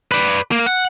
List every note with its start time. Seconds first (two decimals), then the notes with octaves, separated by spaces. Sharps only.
0.12 B4 D5
0.51 A#3
0.66 F#5